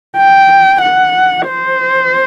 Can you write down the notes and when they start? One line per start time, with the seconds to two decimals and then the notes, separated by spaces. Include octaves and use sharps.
0.17 G5
0.82 F#5
1.47 C5